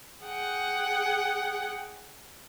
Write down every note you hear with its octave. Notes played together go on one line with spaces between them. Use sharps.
G#4 F#5 G5